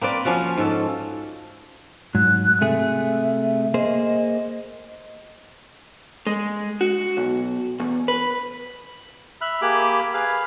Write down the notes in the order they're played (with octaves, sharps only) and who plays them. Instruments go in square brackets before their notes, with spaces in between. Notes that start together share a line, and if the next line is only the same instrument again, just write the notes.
[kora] A#3 C4 B4 D5
F3 C#4 F4 F#4
G#2 A4
[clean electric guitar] G#2 F#3 [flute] F#6
[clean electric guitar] C3 A3 G#4 [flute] E5
[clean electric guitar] A#3 G#4 C5 [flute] D#5
[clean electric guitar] G#3
F#4
B1
E2
B4
[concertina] E5 B5 F6 F#6
A#3 G4 G#4 B5 D6
G#4 B4 F5 F6